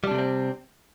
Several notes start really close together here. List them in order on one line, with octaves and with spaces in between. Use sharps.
G3 D4 C3 A3 C4